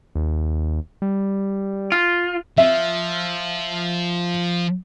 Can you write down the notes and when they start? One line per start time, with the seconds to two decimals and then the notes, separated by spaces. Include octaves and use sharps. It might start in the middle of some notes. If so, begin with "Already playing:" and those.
0.15 D#2
1.02 G3
1.92 F4
2.58 F3 E5